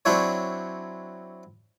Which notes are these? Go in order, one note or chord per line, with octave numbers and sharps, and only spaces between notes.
F#3 C4 D4 E4 C#5